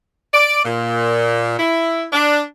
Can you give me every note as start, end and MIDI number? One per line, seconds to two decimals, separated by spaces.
0.34 0.61 74
0.65 1.56 46
1.59 2.06 64
2.13 2.43 62